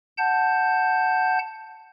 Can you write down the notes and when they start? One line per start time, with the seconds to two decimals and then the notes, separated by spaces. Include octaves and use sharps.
0.17 F#5 A5 G6